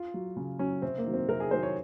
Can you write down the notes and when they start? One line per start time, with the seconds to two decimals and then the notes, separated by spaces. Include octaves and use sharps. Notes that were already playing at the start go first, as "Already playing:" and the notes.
Already playing: F4
0.14 F#3
0.36 C#3
0.59 F#3 C#4
0.82 C3 C4
0.98 A#3
1.05 D#3 F#3
1.13 C4
1.28 C3 A#4
1.40 G#4
1.51 D#3 F#3 C5
1.63 C#5